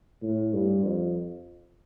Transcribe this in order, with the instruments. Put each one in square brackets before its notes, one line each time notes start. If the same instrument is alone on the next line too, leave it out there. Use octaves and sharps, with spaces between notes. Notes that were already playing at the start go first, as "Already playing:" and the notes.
[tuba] A2
G2
F2